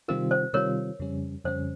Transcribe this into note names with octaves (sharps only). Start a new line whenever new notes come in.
C3 D#3 G3 C4 F4 A#4
C5
C3 D#3 G3 C4 F4 A#4 C#5
F2 C#3 G3 C#4
F2 C#3 G3 C#4 C5